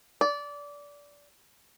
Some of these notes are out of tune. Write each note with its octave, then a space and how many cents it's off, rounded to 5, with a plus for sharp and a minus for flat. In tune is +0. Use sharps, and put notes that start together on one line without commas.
D5 -20